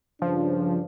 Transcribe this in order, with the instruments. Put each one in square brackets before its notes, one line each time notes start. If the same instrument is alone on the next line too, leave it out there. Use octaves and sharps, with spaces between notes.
[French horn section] G2 C#3 D4 [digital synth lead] F3